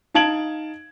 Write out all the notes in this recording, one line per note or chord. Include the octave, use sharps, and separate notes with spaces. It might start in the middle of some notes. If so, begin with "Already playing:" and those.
D#4 F5 A5 G#6 D7 F#7